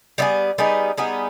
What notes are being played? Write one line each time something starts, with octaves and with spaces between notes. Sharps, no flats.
G3 B3 D#4 G#4
G3 B3 D#4 G#4
G3 B3 D#4 G#4